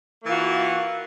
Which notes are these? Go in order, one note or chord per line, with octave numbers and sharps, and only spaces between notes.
E3 A#3 F4 F#4